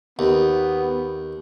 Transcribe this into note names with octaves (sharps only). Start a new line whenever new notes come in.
D#2 B3